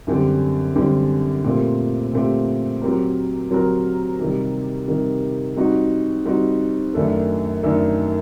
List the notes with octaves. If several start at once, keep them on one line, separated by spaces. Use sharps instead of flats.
F#2 D3 G3 C4 G4
F#2 D3 G3 C4 G4
A#2 A3 C4 G4
A#2 A3 C4 G4
F#3 C4 G4 A#4
F#3 C4 G4 A#4
C3 D#3 G3
C3 D#3 G3
G3 C4 D#4 F#4
G3 C4 D#4 F#4
F#2 D#3 A3 D4 A4
F#2 D#3 A3 D4 A4